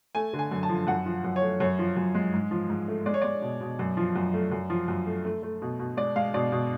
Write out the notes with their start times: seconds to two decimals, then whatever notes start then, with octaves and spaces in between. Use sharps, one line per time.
0.15 A3 G#5
0.33 D3
0.39 G#5
0.51 F#2
0.63 A5
0.69 F3
0.87 F#2 F#5
1.06 F3
1.24 F#2
1.36 C#5
1.42 A3
1.60 F#2 C#5
1.79 F3
1.96 F#2
2.15 G#3
2.33 G#2
2.51 F3
2.70 G#2
2.88 A3
3.06 G#3 D5
3.14 C#5
3.22 G#3 D5
3.42 B2
3.61 B2
3.79 F#2
3.97 F3
4.16 F#2
4.34 A3
4.52 F#2
4.70 F3
4.88 F#2
5.06 A3
5.25 A3
5.43 A3
5.62 B2
5.79 B2
5.97 G#3 D5
6.16 G#3 F5
6.34 B2 D5
6.52 B2